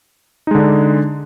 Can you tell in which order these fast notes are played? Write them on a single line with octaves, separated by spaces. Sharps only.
D#4 G#3 D3 D4